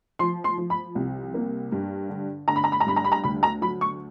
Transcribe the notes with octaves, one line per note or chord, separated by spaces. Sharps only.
F3 C6
C6
F3
B5
C2
A#3
G2
D3
D3 A#5
B5
A#5
B5
A#5
G2 B5
A#5
B5
A#5
D2 B5
A#5
F#3 B5
C#6